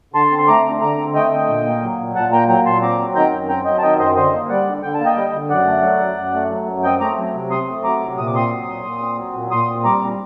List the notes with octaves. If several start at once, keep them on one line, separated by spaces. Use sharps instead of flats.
D3 A5 C6
C4
C6
A3 A#5 D6
D3
D3 A#5 D6
C4
A3 D#5 G5
D3
A#2
A#3
F#3
A#2
A#2 F#5 A5
A#3 G5 A#5
F#3 G5 A#5
A#2 A5 C6
C4 A#5 D6
F#3
D#3 G5 A#5
F#2
C4 G5 A#5
F#3 D#5 G5
A5
D#3 D#5 G5
F#2 C5 D#5
D3 C5 D#5
A#3
G3 D5 F#5
D3
D3 G5
A5
A#3
D#5 G5
G3
D3
F#2 D5 F#5
A3
F#3
F#2
F#2
A3
F#3
F#2
C4 D#5 G5
A3 A#5 D6
F#3
C3
C4 C6 D#6
A3
F#3 A#5 D6
C3
A#2 D#6
D6
C4 C6 D#6
F#3
A#2
A#2
C4
F#3
A#2
A#2 C6 D#6
C4
G3 A#5 D6
A#2